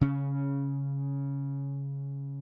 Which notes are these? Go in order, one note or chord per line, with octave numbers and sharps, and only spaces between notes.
C#3 C#4